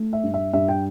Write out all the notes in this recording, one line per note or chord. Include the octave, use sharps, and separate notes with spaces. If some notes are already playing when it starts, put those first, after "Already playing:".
Already playing: A3
E5
G2
E5
G2 E5
G5